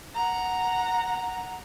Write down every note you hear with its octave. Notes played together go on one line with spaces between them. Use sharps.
F#5 A#5